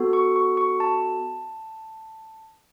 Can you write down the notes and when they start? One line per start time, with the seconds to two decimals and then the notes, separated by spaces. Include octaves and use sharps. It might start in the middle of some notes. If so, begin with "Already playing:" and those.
Already playing: B3 F#4 A4
0.13 C#6
0.36 C#6
0.57 C#6
0.80 A5